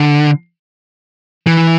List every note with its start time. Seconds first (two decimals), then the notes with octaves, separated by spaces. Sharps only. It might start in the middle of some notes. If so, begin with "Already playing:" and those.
Already playing: D3
1.47 E3